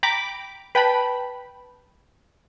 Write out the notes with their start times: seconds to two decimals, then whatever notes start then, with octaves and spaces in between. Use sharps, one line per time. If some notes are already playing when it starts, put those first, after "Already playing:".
0.03 G5 A#5 B5 D6
0.75 B4 G5 A5 B5